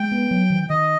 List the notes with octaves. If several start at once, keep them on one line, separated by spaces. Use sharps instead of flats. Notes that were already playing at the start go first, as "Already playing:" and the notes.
Already playing: G#3 G5
B3
F#3
D#3
D#3 D#5